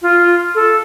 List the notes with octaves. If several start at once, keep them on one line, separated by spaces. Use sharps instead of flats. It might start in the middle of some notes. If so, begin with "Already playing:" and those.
F4
A4